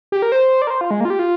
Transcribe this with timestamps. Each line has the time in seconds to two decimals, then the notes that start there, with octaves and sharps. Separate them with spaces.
0.12 G4
0.22 A#4
0.32 C5
0.62 D5
0.67 A#4
0.70 C5
0.81 F4
0.91 G#3
1.00 A#3
1.05 F4
1.10 G4
1.19 F4